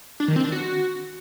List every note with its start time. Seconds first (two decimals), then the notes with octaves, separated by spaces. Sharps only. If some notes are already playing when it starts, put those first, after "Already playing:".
0.20 D4
0.28 D#3
0.36 C4
0.44 D4
0.52 F#4